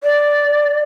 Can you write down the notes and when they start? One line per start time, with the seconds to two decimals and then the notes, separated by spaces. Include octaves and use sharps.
0.04 D5